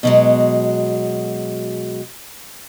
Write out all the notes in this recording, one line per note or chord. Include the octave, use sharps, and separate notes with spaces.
B2 F#3 G#3